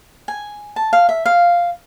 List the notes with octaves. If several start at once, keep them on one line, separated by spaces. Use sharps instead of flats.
G#5
A5
F5
E5
F5